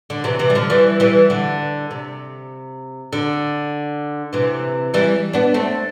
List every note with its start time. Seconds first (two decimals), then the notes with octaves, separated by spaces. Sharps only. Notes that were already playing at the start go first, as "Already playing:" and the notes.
0.10 D3
0.24 C3 E3
0.39 C3 E3
0.50 G3
0.55 D3 F3
0.70 E3 G3
1.00 E3 G3
1.30 D3
1.91 C3
3.13 D3
4.33 C3 E3
4.94 E3 G3
5.33 B3 D4
5.54 A3 C4